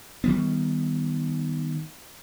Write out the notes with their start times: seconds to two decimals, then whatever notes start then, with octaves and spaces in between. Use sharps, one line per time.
0.24 D#3 G3 B3